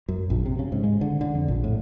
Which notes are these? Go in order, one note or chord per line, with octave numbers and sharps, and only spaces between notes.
F#2
A#1
C3
C#3
G#2
G#3
D3
D3
F2
A#1
A2